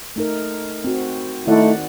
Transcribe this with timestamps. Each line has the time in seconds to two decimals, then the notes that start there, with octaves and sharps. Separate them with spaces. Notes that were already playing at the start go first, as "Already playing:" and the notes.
0.16 A3 D#4 A#4
0.84 C4 F#4
1.47 D#3 A3 D#4 E4 D5 F#5